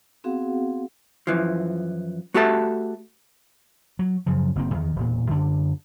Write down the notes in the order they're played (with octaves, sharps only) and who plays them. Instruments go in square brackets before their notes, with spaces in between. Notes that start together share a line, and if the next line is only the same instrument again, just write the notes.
[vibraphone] B3 C4 F#4 G#4 F5 F#5
[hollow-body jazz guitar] F#2 E3 F3
A3 F#4 G4 A4 E5 A5
[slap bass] F#3
F#2 C#3 F3
F#1 A#3 C4
E2 D#3
E1 A#2
F#2 D3 D4